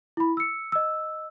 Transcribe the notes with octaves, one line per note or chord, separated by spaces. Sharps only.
E4 B5
E6 C#7
D#5 E6